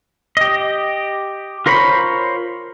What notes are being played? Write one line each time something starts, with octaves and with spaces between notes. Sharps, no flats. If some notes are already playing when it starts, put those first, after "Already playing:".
G4 D#5
F4 A#4 C5 C#5 B5